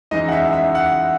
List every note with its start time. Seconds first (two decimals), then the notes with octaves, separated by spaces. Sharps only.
0.11 F#2 E3 G#3 D#4 D#5
0.28 F#5
0.32 E5
0.53 E5
0.75 F#5